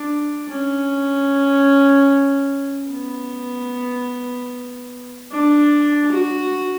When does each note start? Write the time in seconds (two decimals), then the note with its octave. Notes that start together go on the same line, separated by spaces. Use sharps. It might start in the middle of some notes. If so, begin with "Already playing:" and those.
Already playing: D4
0.49 C#4
2.91 B3
5.32 D4
6.11 F#4